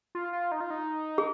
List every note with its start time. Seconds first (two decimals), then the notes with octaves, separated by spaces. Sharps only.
0.15 F4
0.33 F4
0.52 D#4
0.61 F4
0.70 D#4
1.18 G#4